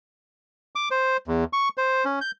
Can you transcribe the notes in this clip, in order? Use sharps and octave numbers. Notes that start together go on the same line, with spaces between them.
D6
C5
E2
C#6
C5
C#4
G6